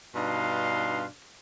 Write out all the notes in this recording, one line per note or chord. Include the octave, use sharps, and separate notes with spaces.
G2 B2 D4 D#4 F5 C6